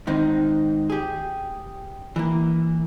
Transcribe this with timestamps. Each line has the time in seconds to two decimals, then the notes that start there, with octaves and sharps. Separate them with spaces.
0.07 G#2 D#3 C4 D#4
0.90 G4 G#4
2.16 E3 A#3